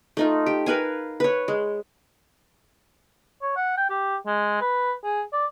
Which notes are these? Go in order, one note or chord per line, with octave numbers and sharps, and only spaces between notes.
A3 D#4 F4
G4
A#4 B4 F5 G#5
B4 C#5
G#3
C#5
F#5
G5
G4
G#3
B4
G#4
D5